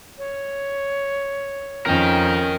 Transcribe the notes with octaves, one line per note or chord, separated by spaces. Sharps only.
C#5
F2 C#4 A#4 D#5 G5